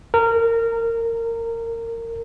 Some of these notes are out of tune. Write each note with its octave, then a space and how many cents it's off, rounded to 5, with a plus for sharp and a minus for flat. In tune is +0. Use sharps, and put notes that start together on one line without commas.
A#4 -20